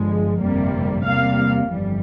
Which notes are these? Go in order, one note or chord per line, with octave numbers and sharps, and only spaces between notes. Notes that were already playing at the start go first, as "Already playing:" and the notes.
Already playing: G1 G2 F3 G#3
G1 F2 C3 G3 A#3
E2 C3 G3 A#3 F5
G1 F2 E3 G3